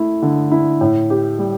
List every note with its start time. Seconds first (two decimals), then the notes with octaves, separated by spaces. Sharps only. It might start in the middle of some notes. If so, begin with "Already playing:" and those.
Already playing: A3 E4
0.22 D3
0.52 E4
0.81 A2
1.10 G4
1.39 G3